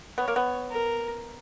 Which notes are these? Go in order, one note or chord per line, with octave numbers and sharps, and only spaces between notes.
B3 C#5
A#3
B3
A#4